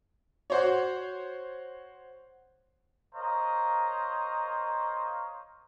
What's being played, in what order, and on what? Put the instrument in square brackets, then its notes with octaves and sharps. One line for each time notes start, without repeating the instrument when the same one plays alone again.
[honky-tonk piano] F#4 C5 C#5
[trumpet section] A#4 C5 C#5 D#5 F5 A#5